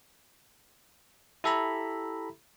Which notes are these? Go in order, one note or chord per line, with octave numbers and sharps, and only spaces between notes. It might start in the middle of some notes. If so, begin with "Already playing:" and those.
E4 G4 A4 E5 A#5 B5